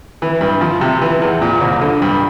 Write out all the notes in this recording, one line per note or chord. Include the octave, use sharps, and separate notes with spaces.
E3
G2
F3
C3
E3
E2
A#2
C2
D3
G2